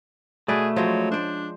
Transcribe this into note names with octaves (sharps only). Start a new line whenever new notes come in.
B2 A3 G#4 B4 D5
F3 F#3 G#3 C#4
D4 C5 D5